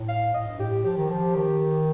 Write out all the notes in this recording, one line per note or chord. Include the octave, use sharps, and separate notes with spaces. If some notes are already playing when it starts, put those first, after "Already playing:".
Already playing: A2
F5
A2 D#5
G2
A2 G4
F3 G4
D#3
F3
D#3